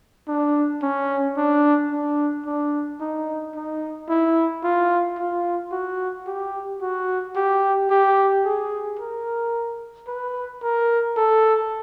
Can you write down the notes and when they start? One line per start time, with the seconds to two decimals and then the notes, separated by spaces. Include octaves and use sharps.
0.28 D4
0.83 C#4
1.37 D4
1.91 D4
2.46 D4
3.01 D#4
3.55 D#4
4.09 E4
4.64 F4
5.19 F4
5.72 F#4
6.27 G4
6.82 F#4
7.36 G4
7.91 G4
8.45 G#4
8.99 A#4
10.08 B4
10.63 A#4
11.17 A4